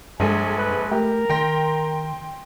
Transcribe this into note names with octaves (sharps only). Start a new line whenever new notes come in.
A#1 G2 G#3 A4 G#5
B4
A3 G4 A#4
D#3 G5 C6 A#6